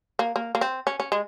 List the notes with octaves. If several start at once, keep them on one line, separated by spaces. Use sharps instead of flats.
A#3
A#3
A#3
C4
C#4
C#4
G#3